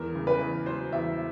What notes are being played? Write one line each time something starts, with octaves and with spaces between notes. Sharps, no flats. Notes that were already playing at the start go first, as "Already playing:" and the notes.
Already playing: E2 A#4
C#3
B4
E2
F#3 C5
E2 E5